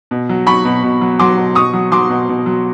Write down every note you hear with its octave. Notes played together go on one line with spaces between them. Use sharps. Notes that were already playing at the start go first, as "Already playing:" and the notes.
B2
F#3
F#3 B5 C#6
B2
B2
F#3
F#3 C6 D6
B2
B2 C#6 D#6
F#3
F#3 C6 D6
B2
B2
F#3